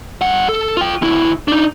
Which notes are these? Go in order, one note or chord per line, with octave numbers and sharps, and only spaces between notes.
G2 F#5
A4
F4 G5
D2 E4
D4 D#4